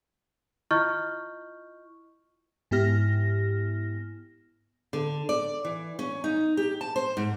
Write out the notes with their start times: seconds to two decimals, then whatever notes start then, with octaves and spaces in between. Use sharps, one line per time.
0.71 E4 F4 D#5 C#6 F6 G6
2.71 G#2 B3 E4 G4 F6 A#6
4.93 D3
5.29 D5
5.65 E3
5.99 C#4
6.24 D#4
6.57 G4
6.81 A5
6.96 C5
7.17 G#2